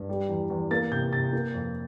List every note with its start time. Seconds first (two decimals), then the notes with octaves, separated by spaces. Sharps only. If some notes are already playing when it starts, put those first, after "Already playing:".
Already playing: G2
0.09 G3
0.29 E2
0.50 E2
0.71 A#3 A6
0.92 C3 G6
1.12 C3 A6
1.33 A#3
1.54 F2